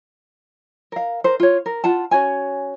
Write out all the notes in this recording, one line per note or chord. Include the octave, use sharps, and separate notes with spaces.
A#4 F5
A#4 C5
F4 C#5
A#4
F4 F#5 A5
C#4 F#4 C#5 G#5